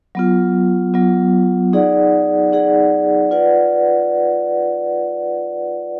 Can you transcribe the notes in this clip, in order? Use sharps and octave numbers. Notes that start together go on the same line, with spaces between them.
F#3 B3 F4
F#3 B3 F4
D#4 G#4 D5 F#5
D#4 G#4 D5 F#5
F4 B4 D5 F#5